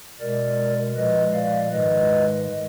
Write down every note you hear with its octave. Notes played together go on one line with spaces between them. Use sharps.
B2 G#3 A#4 D5
A#2 F3 G#3 B4 D#5
D5 F5
G#2 D#3 G#3 B4 D#5